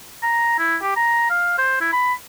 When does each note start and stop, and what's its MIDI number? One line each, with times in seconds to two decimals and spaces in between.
0.23 0.56 82
0.58 0.76 64
0.82 0.92 67
0.96 1.28 82
1.30 1.56 77
1.58 1.76 72
1.81 1.91 64
1.92 2.14 83